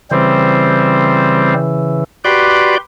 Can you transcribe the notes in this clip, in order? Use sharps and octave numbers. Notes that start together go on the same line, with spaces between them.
C#3 E3 G3 C4 C5
F#4 G4 B4 D5 C6